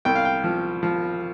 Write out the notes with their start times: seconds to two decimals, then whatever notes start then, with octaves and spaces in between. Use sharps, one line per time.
0.05 C2 G5
0.15 F5
0.25 G5
0.44 F3
0.83 F3